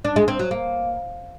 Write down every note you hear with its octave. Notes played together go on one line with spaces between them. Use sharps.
D4
G#3
C4
F#3
A#3